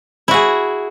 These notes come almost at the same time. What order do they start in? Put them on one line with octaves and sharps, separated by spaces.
E4 F#4 G#4